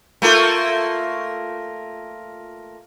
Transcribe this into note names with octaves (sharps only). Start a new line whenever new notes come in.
A3 A#3 F4